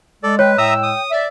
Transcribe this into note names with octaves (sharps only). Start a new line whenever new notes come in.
G#3 A4 D5
B4 C#5 G5
A2 G#3 E5 G5 A#5 D#6 E6
D#6
D5 E5